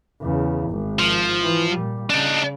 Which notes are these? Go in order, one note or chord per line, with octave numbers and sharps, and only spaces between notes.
E2 C#3
G#1 G#2
F3
E3
A#2 G3
C#3 D4 D#4